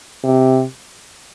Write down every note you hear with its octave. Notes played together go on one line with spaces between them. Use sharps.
C3